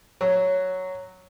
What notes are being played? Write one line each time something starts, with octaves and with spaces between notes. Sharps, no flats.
F#3